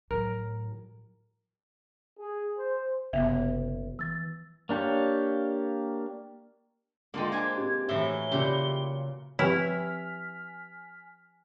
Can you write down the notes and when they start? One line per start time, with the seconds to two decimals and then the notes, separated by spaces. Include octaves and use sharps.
0.11 A2 F#3 A#4
2.19 G#4
2.58 C5
3.13 F#1 C3 B3 E5
3.99 E3 E6 A6
4.69 A#3 D4 G4 C#5 F5
7.14 D3 G#3 A#3 F4 G5
7.32 D4 C5 G#5 G#6
7.58 C4 G4
7.89 A2 E3 F#3 E5 G7
8.32 A#2 C#3 E4 G4
9.39 F3 C4 E4 G4 B4 G#5 F6 B6